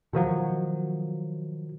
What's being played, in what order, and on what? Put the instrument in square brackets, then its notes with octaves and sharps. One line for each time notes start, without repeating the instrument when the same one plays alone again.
[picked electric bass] B2 D#3 F3 F#3